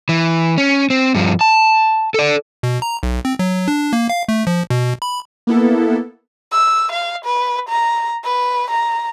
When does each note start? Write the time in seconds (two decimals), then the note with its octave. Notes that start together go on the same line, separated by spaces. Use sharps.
0.09 E3
0.58 C#4
0.90 C4
1.15 G2 F3
1.41 A5
2.14 A4 D5
2.63 B2
2.82 A#5
3.03 B1
3.25 C4
3.39 F#3
3.68 D4
3.93 A#3
4.10 F5
4.29 A3
4.47 F3
4.70 B2
5.02 B5
5.47 A#3 B3 E4 A4
6.52 E6
6.92 F5
7.25 B4
7.70 A#5
8.24 B4
8.70 A#5